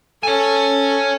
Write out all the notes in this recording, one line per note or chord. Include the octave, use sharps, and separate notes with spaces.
A4 C#5 G#5